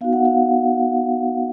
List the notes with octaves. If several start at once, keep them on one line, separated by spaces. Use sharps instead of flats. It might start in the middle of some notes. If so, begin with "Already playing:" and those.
B3 D#4 F#4 F5
F#5
F5
F#5